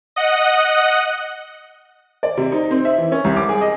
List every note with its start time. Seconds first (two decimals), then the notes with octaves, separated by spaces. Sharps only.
0.16 D#5 F#5
2.23 D5
2.37 C3
2.52 D#4
2.71 C4
2.85 E5
2.98 E3
3.12 C#4
3.24 C2
3.37 D6
3.49 G#4
3.61 D#5